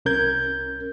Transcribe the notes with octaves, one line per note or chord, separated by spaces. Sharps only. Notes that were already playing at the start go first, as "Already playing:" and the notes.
C2 C#4 A#4 G6 G#6